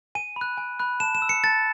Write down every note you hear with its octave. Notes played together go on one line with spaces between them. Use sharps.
G#5 D#7
B5
F#6
G#5
B5 F#6
A5 E7
E7
E6
C#7
A5 A6